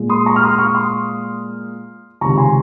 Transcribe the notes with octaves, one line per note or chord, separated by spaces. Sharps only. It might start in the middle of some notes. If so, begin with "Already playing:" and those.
Already playing: A#2 G#3
C6 D#6
A#5 C#6
F6
C6 D#6
C#6 F6
C6 D#6
C#2 C3 D#3 A#5 C#6
G#5 C6